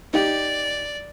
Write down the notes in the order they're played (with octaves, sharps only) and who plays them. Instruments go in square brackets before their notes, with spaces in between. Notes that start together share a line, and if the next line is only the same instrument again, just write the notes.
[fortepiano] D#4 G4 [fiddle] D5